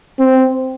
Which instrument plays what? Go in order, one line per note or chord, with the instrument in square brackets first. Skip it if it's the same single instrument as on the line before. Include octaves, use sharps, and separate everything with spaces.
[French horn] C4